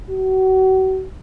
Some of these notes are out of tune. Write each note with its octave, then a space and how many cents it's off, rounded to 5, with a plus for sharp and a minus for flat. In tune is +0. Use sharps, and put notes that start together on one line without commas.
F#4 +35